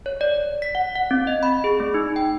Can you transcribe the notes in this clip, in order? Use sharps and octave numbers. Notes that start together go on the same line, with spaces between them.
C#5
D5
B6
F#5
F#5
C4
D#5
B5
G#4
A3
D#4
G5